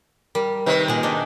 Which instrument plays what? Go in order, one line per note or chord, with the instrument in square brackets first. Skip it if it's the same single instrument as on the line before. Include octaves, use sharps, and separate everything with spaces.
[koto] G3 [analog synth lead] A#4
[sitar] C3 D#3 [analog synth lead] B4
[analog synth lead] A#2 [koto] G#4 F#5
[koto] D4 D#4